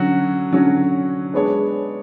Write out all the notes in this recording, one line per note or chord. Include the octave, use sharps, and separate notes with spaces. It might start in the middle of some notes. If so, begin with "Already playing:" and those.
Already playing: D3 F#3 C#4 F#4
D3 F#3 C#4 F#4
G#3 B3 D4 G#4 C#5